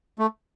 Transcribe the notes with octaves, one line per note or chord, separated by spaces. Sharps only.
A3